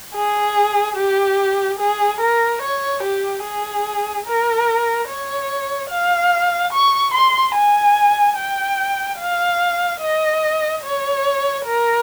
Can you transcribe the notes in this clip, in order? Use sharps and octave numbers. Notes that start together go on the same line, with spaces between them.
G#4
G4
G#4
A#4
C#5
G4
G#4
A#4
C#5
F5
C#6
C6
G#5
G5
F5
D#5
C#5
A#4